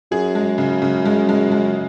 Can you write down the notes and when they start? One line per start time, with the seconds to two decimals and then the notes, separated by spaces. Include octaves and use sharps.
0.12 F#2 G#4
0.35 G#3
0.58 C#3
0.82 C#3
1.05 G#3
1.29 G#3
1.51 G#3